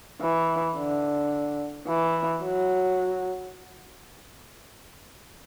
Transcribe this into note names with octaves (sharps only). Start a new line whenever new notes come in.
E3
D3
E3
F#3